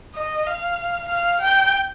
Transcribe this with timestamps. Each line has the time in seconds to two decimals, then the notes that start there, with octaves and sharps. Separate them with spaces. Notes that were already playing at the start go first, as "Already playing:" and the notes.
0.15 D#5
0.47 F5
1.09 F5
1.42 G5